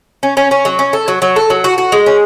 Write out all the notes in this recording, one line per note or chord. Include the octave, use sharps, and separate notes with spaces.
C#4
C#4
C#4
F#3
C#4
A4
F#3
F#3
A4
F#3
F#4
F#4
G#3
C#4